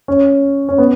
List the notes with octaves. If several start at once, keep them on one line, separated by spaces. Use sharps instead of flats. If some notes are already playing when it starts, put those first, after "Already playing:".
C#4
C#4
B3